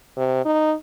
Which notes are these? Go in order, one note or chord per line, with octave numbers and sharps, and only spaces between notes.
C3
D#4